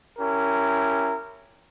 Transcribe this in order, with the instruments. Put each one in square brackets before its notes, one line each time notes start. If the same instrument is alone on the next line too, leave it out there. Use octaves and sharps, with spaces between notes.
[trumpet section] C#4 E4 G4 A#4